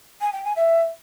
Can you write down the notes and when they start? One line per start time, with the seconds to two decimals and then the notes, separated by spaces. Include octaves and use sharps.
0.21 G#5
0.33 G5
0.44 G#5
0.56 E5